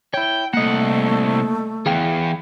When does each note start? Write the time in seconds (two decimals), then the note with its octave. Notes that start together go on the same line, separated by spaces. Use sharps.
0.14 E4 C#5 G5
0.53 C2 A3 A#3 D#5 F#5
1.86 E2 E3 G#4 F5 G5